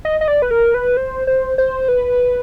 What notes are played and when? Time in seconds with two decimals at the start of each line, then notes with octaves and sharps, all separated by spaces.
0.05 D#5
0.21 D#5
0.28 D5
0.42 B4
0.51 A#4
0.74 B4
0.97 C5
1.27 C5
1.58 C5
1.88 B4